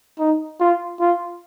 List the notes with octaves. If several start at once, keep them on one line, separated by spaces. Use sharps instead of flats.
D#4
F4
F4